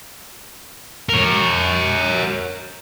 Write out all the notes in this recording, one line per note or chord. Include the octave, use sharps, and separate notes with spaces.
A#4 C#5